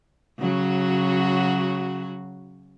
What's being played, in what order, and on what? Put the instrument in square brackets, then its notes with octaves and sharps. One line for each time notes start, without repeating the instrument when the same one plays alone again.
[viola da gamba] C#3 F#3 F#4